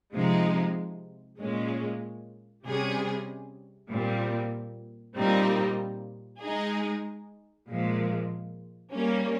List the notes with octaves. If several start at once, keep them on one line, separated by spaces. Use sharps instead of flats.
C3 F3 G#3 D#4
A#2 G#3 C#4
C3 G3 C#4 G#4
A#2 G3 C4
A#2 G3 C4 D#4
G#3 D#4 G#4
A#2 F3 G#3
G3 A#3 C#4